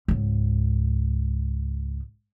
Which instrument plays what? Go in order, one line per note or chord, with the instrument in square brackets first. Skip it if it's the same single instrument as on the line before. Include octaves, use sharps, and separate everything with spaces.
[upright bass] C#2 G#2